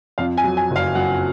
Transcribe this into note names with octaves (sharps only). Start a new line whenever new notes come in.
F2 F5
G#5
F#3
G#5
F#1
F5
F#3 F#5